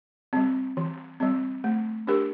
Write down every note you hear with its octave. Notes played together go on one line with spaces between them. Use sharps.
G3 C4
E3
G3 C4
A3
D4 G4 A#4